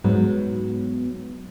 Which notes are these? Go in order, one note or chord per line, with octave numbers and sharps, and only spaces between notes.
G#2 F#3 B3